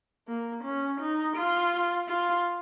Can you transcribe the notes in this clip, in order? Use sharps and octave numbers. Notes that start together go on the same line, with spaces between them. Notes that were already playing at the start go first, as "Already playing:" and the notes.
A#3
C#4
D#4
F4
F4